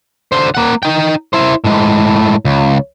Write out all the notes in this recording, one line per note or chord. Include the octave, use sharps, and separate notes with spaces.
D3 C5
A#3 F#5
D#4 G5
E4 C5
A2 G#3
C#2